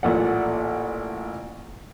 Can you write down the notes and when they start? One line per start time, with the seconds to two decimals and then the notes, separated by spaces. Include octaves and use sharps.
0.03 A1 A#2 A4 D5 F#5